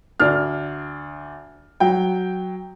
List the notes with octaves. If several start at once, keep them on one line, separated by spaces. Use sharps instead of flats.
D2 D4 F6
F#3 G5